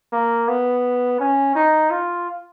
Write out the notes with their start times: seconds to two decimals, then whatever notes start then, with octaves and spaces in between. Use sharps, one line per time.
0.13 A#3
0.48 B3
1.20 C#4
1.55 D#4
1.91 F4